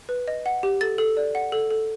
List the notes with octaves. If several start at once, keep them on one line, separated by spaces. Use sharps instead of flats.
B4
D#5
F#5
G4
A4 A6
A4
D5
F#5
A4
A4